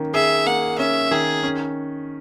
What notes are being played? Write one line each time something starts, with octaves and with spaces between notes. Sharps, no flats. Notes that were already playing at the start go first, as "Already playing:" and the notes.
Already playing: D#3 A#3 C#4
G#4 E5
A#3 F#5
C#4 E5
D#3 G#4
C#4